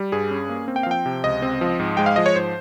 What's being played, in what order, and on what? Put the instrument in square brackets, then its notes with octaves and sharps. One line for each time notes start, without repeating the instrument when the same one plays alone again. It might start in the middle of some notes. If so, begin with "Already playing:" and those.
Already playing: [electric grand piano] G3
G2 G#4
C#4
A#3
C4
G5
F5
F3 G5
C3
C#2 D#5
C4
F3
G#2
G#3 G5
F5
F3 D#5
C#5
G#2 C5